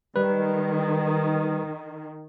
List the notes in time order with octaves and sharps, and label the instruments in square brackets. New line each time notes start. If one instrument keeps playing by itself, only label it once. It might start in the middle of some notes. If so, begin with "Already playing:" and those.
[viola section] D#3 [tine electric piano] G3 B4